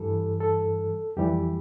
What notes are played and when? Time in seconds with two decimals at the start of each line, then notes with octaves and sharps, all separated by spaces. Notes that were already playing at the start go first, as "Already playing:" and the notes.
Already playing: G2 E3 G3 A4
0.41 A4
1.17 F2 E3 G3 G4